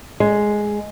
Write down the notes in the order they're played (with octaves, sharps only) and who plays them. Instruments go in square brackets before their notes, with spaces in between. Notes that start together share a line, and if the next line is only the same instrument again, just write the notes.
[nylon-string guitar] G#3